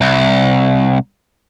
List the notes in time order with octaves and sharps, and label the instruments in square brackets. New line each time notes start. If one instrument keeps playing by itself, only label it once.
[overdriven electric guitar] C2